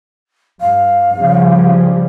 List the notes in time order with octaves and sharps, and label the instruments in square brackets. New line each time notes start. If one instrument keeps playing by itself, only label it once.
[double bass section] G2 [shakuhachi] F5
[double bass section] C#3 F3 G3